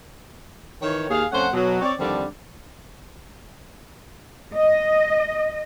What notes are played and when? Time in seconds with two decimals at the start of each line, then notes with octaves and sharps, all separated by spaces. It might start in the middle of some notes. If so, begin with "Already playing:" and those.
0.82 D#3 E3 C#5
1.10 D#2 G#4 F5
1.32 F2 A3 C#4 C5 F#5
1.53 B2 F#3
1.81 C4 C#5 D5
1.99 F2 D3 D#3 G3 C4 D4
4.55 D#5